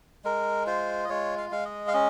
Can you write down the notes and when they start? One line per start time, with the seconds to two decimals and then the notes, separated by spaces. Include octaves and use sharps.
0.24 G#3 A#4
0.67 F4 C5
1.05 D#5
1.09 G#3 C#5
1.38 F5
1.51 G#3 F5
1.65 D#5
1.87 F5
1.94 C#4 D#5